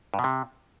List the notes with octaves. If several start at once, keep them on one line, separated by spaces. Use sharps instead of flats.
G2
B2
C3